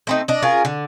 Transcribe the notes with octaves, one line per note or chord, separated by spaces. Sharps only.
A3 C4 D#4
D4 D#5
C#4 F4 G#4 A#4
D3